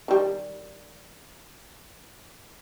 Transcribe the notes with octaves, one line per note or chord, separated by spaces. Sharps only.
D#3 G3